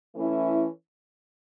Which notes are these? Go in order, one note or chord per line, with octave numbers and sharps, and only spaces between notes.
E3 A3 C#4 E4